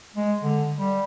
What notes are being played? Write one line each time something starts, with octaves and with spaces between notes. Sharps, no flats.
G#3
D3
G3